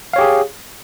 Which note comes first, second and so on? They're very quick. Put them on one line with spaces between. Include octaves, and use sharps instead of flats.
F5 C#5 G4 G#4